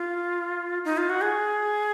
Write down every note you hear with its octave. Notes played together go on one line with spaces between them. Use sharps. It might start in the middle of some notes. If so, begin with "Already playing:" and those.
Already playing: F4
D#4
F4
F#4
G#4